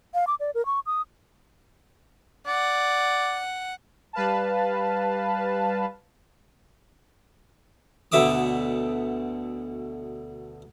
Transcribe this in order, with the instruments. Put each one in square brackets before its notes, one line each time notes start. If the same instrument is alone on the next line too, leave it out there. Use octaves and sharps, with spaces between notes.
[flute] F5
D6
D5
A#4
C#6
D#6
[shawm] D5 [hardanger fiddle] F#5
[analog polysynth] G3 B4 F5 A5
[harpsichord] D2 B2 D3 E5 D6 D#6